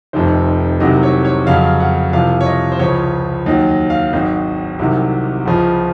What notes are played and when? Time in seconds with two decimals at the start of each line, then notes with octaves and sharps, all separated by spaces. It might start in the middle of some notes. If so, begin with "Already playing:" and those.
0.13 F1 F2 C3 D#3 C5
0.80 C2 C3 D#3 F#3 D#5
1.03 C#5
1.25 C#5
1.46 F2 C#3 F#3 F5
1.80 F#5
2.13 C2 C3 F3 F5
2.41 C#5
2.46 D#5
2.72 C5
2.79 C#2 C#3 F3 C#5
3.46 D#2 D#3 F#3 D#5
3.69 D#5
3.90 F5
4.13 G#1 G#2 F#3 D#5
4.79 C2 C3 D#3 F#3
5.46 C#2 C#3 F3